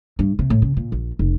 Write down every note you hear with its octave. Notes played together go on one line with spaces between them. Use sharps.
G2
C3
A2
C#3
A#2
A#1
F1